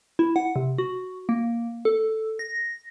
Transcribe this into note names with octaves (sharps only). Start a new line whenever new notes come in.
E4
F#5
C3
F#4
A#3
A4
A#6